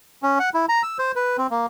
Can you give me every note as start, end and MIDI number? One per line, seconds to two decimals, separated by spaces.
0.23 0.39 61
0.40 0.50 78
0.54 0.66 64
0.69 0.82 82
0.83 0.98 88
0.99 1.12 72
1.16 1.37 71
1.38 1.47 60
1.51 1.66 58